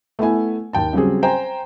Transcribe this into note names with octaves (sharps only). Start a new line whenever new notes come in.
A3 B3 E4 G#5
D#2 G5 A5
C#3 F#3 G3 C4 G#4
C5 G5 G#5 A#5